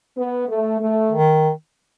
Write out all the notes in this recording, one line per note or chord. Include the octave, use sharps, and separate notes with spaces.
B3
A3
A3
D#3